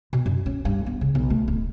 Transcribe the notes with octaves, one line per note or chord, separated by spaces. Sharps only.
B2
F#2
C#4
G2
B3
C#3
B1
A3
D1